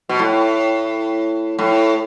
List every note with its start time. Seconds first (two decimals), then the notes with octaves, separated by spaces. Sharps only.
0.09 B2
0.19 A2
1.59 A2